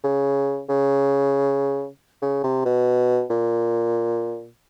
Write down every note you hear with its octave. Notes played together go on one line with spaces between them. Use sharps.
C#3
C#3
C#3
C3
B2
A#2